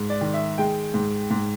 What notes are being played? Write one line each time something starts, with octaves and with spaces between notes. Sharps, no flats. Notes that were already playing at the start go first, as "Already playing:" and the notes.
Already playing: G#2
D5
D#3
E5
G#3 G5
G#2
G#2